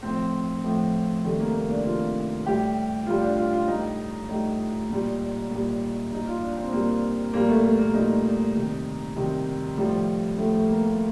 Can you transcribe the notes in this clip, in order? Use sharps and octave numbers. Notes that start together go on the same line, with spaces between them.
A2 F3 C4
A2 F3
C3 D#3 G3 A3
A#3
A#3
D4
C3 D#3 G3 F4
A2 G3 G4
A2 G3 F4
D4
F4
F4
A2 G3 D#4
A2 G3 D#4
A#2 G3
A#2 G3
A#2 G3 D#4
F4
D4
C4
A#2 G3 A#3
A#2 G3 A#3
A3
A3
A#3
A#2 G3 D#4
C3 D#3 G3
C3 D#3 G3
A2 F3 G3
A2 F3 A3
A3
A#3
A#3